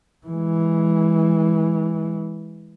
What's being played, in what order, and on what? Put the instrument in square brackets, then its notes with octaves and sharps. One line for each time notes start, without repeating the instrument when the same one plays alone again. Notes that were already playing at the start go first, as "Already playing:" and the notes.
[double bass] E3 G#3